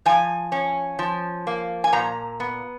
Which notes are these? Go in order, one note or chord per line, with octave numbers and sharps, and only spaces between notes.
F3 G#5
C#4
F3
A#3
G#5
A#2 A#5
B3